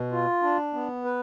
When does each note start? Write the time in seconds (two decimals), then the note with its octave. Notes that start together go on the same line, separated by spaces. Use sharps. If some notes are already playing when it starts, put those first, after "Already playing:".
Already playing: B2
0.12 F4
0.42 D4
0.74 B3
1.05 B4